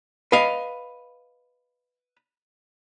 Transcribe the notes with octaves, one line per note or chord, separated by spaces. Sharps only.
B4 D#5 F5